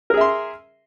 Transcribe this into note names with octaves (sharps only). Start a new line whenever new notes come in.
G#4 A#4 E5 C6